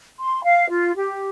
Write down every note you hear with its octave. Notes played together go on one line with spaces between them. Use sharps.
C6
F5
F4
G4